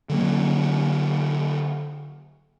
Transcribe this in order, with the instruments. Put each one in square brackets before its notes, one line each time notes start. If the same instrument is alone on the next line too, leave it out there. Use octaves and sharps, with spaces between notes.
[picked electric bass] D3 F#3 A#3